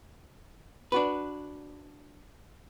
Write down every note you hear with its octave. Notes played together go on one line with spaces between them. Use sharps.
D4 F#4 B4